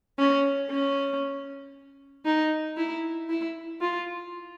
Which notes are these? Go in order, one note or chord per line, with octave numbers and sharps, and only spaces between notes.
C#4
C#4
D#4
E4
E4
F4